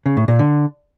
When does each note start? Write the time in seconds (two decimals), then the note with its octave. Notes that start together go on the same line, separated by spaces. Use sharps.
0.06 C#3
0.17 A2
0.28 A#2
0.39 D3